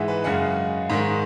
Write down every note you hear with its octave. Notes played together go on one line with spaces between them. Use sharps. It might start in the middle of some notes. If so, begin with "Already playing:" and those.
Already playing: G#2 E3 G#3 E5 F#5
B4
F#2 C#3 G#3 F#5
G#2 D#3 G#3